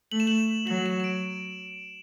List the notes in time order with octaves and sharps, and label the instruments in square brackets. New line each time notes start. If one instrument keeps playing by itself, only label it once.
[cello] A3 [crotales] F#7
[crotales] E7
F#7
[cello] F#3 [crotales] F#7
[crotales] E7
E7
D7